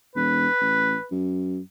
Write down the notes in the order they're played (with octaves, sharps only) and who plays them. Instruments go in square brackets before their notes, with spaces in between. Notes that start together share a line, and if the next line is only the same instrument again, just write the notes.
[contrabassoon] E1 [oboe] B4
[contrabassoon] A1
F#2